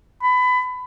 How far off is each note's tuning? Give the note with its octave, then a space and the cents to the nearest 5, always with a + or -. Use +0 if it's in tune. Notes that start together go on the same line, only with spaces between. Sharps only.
B5 +25